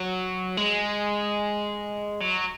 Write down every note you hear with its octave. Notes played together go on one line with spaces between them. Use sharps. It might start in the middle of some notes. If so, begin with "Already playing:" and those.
Already playing: F#3
G#3
F#3